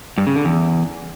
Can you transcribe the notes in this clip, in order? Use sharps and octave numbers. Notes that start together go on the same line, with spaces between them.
G2
C#3
D3
E2